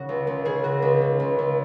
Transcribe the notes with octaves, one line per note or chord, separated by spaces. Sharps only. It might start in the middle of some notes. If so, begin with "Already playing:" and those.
Already playing: C#3 F#4
C#2
C#2
C#3 G#4
C#2 F#4
C#2
C#3
C#2
C#2